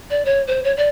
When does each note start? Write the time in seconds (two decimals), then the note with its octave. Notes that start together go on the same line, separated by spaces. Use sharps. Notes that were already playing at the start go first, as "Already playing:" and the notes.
0.10 D5
0.25 C#5
0.47 C5
0.64 C#5
0.77 D5